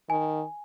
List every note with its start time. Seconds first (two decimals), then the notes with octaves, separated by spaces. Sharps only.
0.09 D#3 G#5